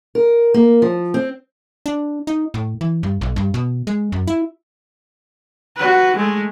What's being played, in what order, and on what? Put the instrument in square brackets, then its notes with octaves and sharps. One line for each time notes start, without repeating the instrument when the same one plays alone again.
[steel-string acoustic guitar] A#4
A#3
F3
C4
[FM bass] D4
D#4
A2
E3
G2
B1
G2
B2
G#3
F#2
E4
[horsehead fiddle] F#4 B4
G#3 A3